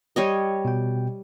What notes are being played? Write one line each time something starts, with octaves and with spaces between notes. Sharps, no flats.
G3 C#5 D#5
B2 G5